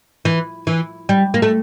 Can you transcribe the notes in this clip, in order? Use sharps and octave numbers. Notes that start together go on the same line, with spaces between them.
E3
E3
G3
A#3
A3